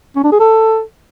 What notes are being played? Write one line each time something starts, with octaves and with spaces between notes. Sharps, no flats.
C#4
D4
G#4
A4